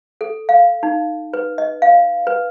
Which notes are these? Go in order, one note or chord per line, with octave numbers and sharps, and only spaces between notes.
A4
F5
D#4
B4
D#5
F5
B4